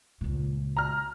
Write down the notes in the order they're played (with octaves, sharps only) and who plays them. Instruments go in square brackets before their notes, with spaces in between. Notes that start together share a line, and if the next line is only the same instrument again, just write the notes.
[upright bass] C#2 A#2
[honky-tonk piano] A#5 F6